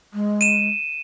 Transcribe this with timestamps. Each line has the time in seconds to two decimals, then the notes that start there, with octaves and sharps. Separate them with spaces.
0.14 G#3
0.41 D#7 E7